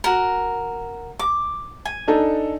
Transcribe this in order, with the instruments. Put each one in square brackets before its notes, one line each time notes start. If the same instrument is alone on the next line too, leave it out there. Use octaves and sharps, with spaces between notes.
[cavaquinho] F#4 A#4
D6
G#5
[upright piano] D4 D#4 A4